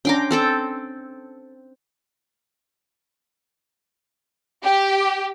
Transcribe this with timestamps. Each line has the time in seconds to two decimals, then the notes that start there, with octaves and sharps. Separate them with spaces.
0.05 C#4 D4 G5 A#5 C6 D6
0.31 C4 A4 G5
4.64 G4